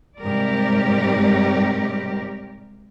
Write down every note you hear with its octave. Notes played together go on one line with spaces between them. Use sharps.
G#2 C3 G3 G4 A#4 D5